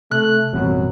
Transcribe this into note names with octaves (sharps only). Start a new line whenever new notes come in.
C3 A3 F#6
A1 F#2 B2 E3 F#3 G3 C4